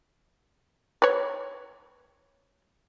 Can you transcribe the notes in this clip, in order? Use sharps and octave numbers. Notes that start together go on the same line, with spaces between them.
B4 C#5